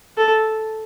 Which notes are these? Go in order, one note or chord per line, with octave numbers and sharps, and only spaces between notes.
A4